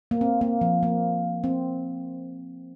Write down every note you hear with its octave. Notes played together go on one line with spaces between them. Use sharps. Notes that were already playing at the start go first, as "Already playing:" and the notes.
A#3
C4
A#3
F3
A#3
C4